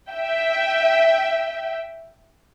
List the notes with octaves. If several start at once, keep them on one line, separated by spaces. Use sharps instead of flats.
E5 G5